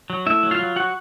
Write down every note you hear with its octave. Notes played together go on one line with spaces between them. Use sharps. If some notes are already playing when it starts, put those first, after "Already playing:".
F#3
A3 E4 E5
F#3
F4 F5
F#3
F#3 F#4 F#5